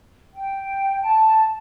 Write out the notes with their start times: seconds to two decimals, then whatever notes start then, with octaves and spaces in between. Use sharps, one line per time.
0.34 G5
1.02 A5